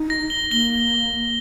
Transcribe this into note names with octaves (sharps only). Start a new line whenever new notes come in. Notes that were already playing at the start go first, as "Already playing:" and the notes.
Already playing: D#4
A#6
G7
A#3 G7